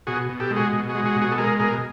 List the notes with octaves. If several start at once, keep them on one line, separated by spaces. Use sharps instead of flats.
B2 F#4 G#4
B2
G4 A4
G#3
F#4 G#4
B2
F#4 G#4
G#3
F#4 G#4
B2
F#4 G#4
A4
G#3 G#4 A#4
B2 G#4 A#4